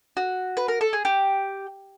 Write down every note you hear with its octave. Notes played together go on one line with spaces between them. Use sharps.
F#4
B4
A#4
A4
G#4
G4